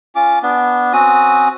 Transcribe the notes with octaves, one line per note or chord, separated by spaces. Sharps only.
C#4 F4 D6
B3 D4
C4 C#4 F#4 D#6